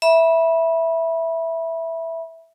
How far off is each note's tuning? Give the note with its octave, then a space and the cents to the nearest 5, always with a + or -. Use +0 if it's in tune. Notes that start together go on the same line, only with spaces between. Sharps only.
E5 +0 B5 -25